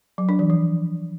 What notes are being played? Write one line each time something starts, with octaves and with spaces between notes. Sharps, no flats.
F#3
D4
E3
F3